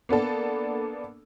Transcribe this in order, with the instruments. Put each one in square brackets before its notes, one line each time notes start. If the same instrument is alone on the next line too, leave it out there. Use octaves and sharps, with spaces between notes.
[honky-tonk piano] A#3 B3 D4 A4